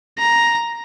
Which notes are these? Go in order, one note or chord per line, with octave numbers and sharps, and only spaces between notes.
A#5